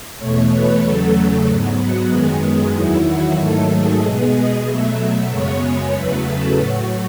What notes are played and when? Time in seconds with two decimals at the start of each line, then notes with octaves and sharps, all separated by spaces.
0.19 E2 B2 A3 C#5
0.52 B4
0.83 E2 C#3 F#3 A3 A4
1.47 G#2 F#3 B3
1.79 F#4
2.10 F#2 D#3 G#3 B3 G#4
2.74 E2 D#3 F#3 E4
3.06 F#4
3.38 G#2 D#3 F#3 A3 A4
3.70 G#4
4.02 B2 G#3 B3
4.34 D#5
4.66 B2 F#3 A3 E5
5.29 F#2 C#3 G#3 B3 C#5
5.61 C#5
5.93 E2 C#3 F#3 A3 B4
6.25 A4
6.57 A2 F#3 A3 F#4